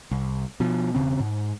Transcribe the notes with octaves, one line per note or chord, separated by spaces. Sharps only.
C2
B2 F3
E1 D#2 C#3 C4
G#2